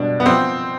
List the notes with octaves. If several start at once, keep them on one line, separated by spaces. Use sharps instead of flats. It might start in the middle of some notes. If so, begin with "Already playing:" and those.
Already playing: B2 G3 D4
B3
F3 C4